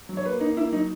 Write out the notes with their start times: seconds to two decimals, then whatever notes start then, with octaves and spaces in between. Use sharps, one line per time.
0.09 F#3
0.17 C#5
0.25 A#3 B4
0.41 A#3 D#4
0.57 A#3 E4
0.72 F#3 D#4